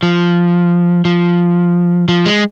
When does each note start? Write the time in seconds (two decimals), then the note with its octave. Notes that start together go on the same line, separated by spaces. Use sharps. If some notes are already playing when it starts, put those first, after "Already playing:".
0.03 F3
1.05 F3
2.08 F3
2.26 G#3